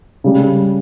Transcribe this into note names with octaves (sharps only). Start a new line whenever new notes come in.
C#3 G3